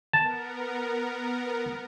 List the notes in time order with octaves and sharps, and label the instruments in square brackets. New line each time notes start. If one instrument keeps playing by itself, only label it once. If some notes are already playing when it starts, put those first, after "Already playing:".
[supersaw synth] B3 A#4 [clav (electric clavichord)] A5